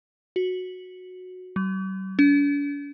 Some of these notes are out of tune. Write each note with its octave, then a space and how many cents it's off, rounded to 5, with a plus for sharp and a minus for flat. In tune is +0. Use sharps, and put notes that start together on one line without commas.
F#4 -10
G3 -45
D4 -45